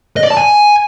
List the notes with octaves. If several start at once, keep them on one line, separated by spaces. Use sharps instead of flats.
D#5
D5
A5
G#5